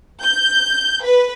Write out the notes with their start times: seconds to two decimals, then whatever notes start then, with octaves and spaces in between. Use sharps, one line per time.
0.24 G6
1.04 B4